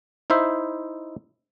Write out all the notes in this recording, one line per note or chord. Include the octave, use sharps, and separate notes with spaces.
D#4 E4 C5 E5